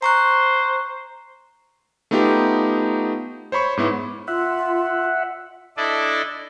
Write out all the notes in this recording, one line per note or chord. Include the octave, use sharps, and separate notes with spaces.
C5 A#5 C#6 F#6
A3 B3 D#4 F4 G4
C5 C#5 B5 C#6
G#2 B3 E4
F4 E5 F#5
D4 E4 A4 D5 D#5